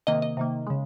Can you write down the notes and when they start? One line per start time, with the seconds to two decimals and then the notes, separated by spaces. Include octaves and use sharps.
0.07 C3 D#3 A#3 D#5
0.22 D#5
0.37 C3 D#3 A#3
0.67 C#3 G#3